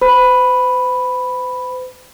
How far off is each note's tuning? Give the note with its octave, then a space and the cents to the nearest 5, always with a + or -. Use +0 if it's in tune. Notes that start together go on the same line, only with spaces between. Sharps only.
C5 -45 B5 +0